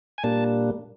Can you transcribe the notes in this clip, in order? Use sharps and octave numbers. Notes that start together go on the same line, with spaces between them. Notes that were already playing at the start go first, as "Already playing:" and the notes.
G#5
A#2 G3 A#3 D4 A5